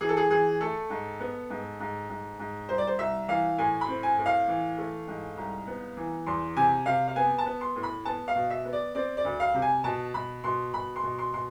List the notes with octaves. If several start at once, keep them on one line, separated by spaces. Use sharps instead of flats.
E3 G#4
A4
G#4
E3 G#4
A3 A4
G#2
B3
G#2
G#2
G#2
G#2
C2 C5
D5
C5
C2 E5
E3 F5
A2 G#5
B5
C4
G#5
A2
F5
E3
A3
G#2
C2
B3
E3
E2 C6
C3 G#5
C3 F5
F5
B3 G#5
A5
B3
C6
A2
B5
B3 A5
F5
B2
E5
B3
D5
C4 D5
D5
D2
F5
C3
G#5
B2 A5
B2 B5
B2 C6
B2 B5
C6
B2
C6
B2 C6